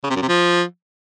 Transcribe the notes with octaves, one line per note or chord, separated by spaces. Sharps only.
C#3
C3
F#2
C3
F3